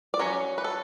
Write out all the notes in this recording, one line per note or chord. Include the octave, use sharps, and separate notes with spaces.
D5
F#3 C#4 C#5
B4
A4